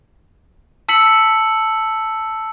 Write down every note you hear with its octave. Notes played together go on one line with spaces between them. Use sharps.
A5 E6 B6 C#7 F#7